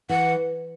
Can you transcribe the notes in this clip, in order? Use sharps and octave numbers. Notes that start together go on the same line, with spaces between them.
E3 F#5